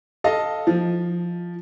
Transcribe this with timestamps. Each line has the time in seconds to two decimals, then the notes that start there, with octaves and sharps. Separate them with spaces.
0.24 A4 D#5 F5
0.67 F3